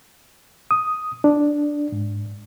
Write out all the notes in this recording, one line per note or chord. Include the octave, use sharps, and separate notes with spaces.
D#6
D4
G#2